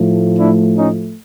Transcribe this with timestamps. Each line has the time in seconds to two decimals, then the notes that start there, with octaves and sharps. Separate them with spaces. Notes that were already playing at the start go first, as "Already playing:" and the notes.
Already playing: A2 F3 A3
0.37 D4 E4
0.77 C#4 D#4